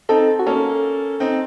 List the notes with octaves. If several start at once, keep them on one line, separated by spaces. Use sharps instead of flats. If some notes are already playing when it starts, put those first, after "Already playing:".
C4 D#4 A4
F#4
A#3 C#4 A4
C4 D#4